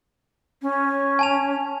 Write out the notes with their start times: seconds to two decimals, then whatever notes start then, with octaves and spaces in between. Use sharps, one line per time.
0.62 C#4
1.19 G#5 A5 F7